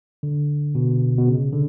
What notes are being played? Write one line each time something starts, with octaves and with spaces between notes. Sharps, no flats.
D3
B2
B2
C#3
D3